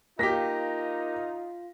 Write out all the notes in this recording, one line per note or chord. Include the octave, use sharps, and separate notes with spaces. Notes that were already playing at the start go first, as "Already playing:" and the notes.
A#3 D#4 F4 G4 A#6 B6